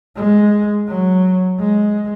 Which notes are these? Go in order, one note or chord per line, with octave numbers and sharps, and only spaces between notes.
G#3
F#3
G#3